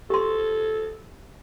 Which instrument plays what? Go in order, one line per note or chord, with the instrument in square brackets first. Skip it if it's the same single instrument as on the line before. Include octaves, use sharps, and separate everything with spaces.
[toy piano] G4 C6 [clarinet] A4